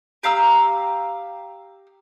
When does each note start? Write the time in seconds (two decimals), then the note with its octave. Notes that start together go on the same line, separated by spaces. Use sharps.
0.23 G4 F5 A#5 E6